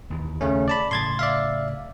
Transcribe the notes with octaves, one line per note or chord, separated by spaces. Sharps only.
D#2 E3
C#3 A3 C#4
D5 A5 B5
A2 C#3 C6 G#6 A6
D5 E5 F5